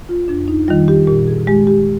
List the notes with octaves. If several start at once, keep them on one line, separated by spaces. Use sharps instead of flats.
F4
F2 D4
D#4
D#3 G3 F4
G4
A#2 G4
G#4
G#3 G4
G4